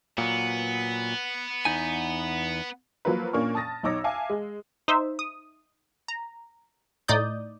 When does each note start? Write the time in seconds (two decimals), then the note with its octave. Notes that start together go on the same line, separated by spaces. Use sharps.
0.18 A#2 F#3 B3
1.65 E2 D#4 G#5
3.05 F3 F#3 A#3 F4 B4
3.33 A#2 A#3 C#4 D4 C#6 F6
3.55 A5 D#6 A6 A#6
3.83 B1 D#4 C#5 D6 E6 A#6
4.04 E5 F5 G#5 A5 D6
4.30 G#3
4.88 D#4 C5 E5
5.19 D#6
6.08 A#5
7.08 A2 D#4 D5 D#6 G6